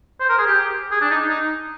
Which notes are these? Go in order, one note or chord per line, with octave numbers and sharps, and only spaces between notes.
C5
A#4
G#4
G4
G#4
D4
D#4
D#4